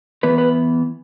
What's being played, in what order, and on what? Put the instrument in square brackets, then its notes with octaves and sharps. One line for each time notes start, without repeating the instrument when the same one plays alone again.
[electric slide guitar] E3 B3 B4
B4